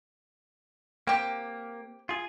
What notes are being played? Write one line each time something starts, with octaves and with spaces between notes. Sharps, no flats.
A#3 C4 G4
F4 G#4